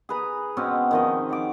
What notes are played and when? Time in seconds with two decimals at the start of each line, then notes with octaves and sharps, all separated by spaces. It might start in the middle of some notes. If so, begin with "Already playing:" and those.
0.09 G#4 B4 A#5
0.57 B2 G#3 C4 C#4
0.91 D#3 F3 D#5
1.29 C#5 F#5 D6